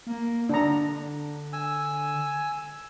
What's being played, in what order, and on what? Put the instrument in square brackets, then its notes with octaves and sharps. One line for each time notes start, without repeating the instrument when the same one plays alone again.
[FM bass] A#3
[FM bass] D3 [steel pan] D4 A#5
[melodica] G#5 E6